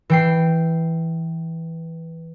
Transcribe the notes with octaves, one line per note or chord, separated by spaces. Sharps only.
E3 G5 C7